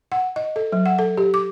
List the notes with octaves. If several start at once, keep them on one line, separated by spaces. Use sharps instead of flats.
F#5
D#5
A4
F#3
F#5
A4
G4
D6